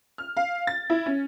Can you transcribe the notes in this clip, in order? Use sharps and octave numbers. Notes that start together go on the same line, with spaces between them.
F6
F5
A6
E4
C#4